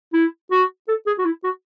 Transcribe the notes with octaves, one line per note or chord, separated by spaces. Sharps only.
E4
F#4
A4
G#4
F#4
E4
F#4